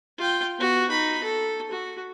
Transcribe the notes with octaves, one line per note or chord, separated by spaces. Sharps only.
F4 G5
B3 F#4
D#4 B5
A4
F#4